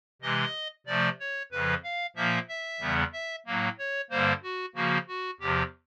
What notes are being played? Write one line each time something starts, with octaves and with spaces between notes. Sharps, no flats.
C3 E3 G#3 D#5
C3 F3 A3 D5
C#5
F2 C#3 F3 B4
F5
A#2 F3 A#3 E5
E5
E2 C#3 E3 G3 B3
E5
A2 F#3 A#3
C#5
G2 D3 G3 A#3 C5
F#4
C#3 F3 A#3 F#4
F#4
E2 C3 F3 G4